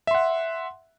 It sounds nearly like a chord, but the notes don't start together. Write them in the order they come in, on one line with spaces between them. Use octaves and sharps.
E5 C6 F#5